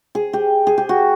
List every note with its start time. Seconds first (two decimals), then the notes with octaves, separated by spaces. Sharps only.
0.15 G#4
0.33 G4
0.67 G#4
0.78 G4
0.89 F#4